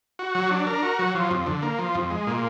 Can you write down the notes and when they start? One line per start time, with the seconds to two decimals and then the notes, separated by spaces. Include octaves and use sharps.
0.19 F#4
0.35 F#3
0.51 D4
0.67 A#4
0.83 F#4
0.99 F#3
1.14 F3
1.30 F2
1.47 D3
1.62 A#3
1.78 F3
1.95 F2
2.11 G#3
2.27 A#2